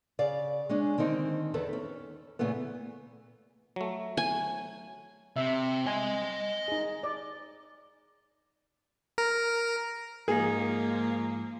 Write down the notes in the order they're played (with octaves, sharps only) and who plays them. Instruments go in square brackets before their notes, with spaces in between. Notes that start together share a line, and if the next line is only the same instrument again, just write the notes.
[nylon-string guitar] C#3 D5 F5
G#3 C#4 D4
D3 D#3 C4 D#4
E2 D#3 A4 B4
C#4
A#2 C#3 E3 A3 B3
[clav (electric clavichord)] F#3 A3
[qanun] G#5
[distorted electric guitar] C3 [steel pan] E5
[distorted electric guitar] D#5 C6 [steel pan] G#5
[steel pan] D#4 G#4
D5
[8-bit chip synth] A#4
[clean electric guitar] G#2 D#4 [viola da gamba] F3 A#3 [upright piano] G#4